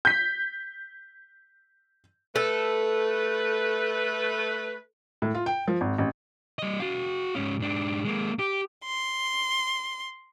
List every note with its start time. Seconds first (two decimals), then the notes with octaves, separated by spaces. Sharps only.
0.05 G6 B6
2.36 A3 A4 B4
5.22 A2
5.35 F4
5.46 G5
5.68 F3
5.81 G#1
5.98 A1
6.59 G3 D#5
6.80 F#4 F5
7.36 G#2 C#4
7.60 G#2 D4
8.05 G#3 A#3
8.39 G4
8.86 C6